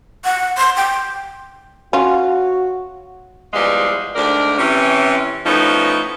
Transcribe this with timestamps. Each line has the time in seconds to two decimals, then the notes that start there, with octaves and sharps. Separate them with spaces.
0.25 F#5
0.58 C6
0.77 G5
1.93 C#4 F4 F#4
3.54 E2 F3 G3 G#3 F5
4.16 D2 G#2 D4 A#4 D5
4.58 C3 E3 C#4
5.46 A2 F3 B3 C#4 D#4